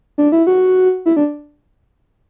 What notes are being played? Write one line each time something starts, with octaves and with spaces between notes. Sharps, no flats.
D4
E4
F#4
E4
D4